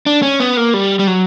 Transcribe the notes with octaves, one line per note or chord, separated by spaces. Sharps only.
D4
C#4
B3
A#3
G3
G3
F#3